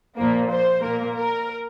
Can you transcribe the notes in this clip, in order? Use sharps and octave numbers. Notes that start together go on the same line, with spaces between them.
A#2 F3 A#3
C5
A#2 A#3 A#4
A#4